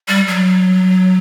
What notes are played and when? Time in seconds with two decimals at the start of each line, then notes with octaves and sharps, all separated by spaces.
0.08 G3
0.28 F#3